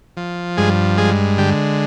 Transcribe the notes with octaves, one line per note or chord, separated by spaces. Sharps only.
F3
G2 G#3 G#4
G#3 G#4
D3 G4